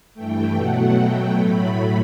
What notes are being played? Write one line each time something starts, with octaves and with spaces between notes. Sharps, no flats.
G2 E3 A3 G5
B2 F#3 A3 F#5
B2 F#3 A3 G5
A2 F#3 A3 B5